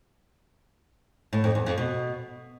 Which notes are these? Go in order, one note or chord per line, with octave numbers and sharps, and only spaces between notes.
A2
F2
E2
F2
B2